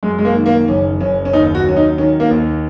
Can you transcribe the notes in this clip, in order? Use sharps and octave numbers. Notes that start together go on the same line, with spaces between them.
F#2 G#3
G#3
A#3
D#3
A#3
F#1 C#4
F#1 C#4
C#4
D#2 D#4
F#4
F#3 C#4
D#4
D#3 C#4
A#3
D#2